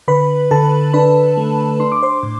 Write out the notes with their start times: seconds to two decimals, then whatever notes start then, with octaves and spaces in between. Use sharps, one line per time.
0.08 D3 B4 B5
0.51 D3 A4 A5
0.94 D4 B4 B5
1.37 A3
1.80 D4 C6
1.92 D6
2.03 C5 C6
2.23 A2